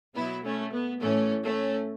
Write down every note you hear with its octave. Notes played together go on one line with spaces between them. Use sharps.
B2 F#3 B3 E4
A3 C#4
B3
A2 E3 A3 C#4
A3 C#4